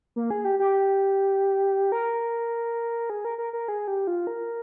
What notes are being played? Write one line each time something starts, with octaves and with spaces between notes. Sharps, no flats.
A#3
G#4
G4
G4
A#4
G#4
A#4
A#4
A#4
G#4
G4
F4
A#4